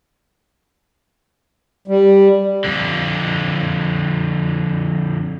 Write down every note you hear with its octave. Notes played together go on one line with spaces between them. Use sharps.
G3
F2 D3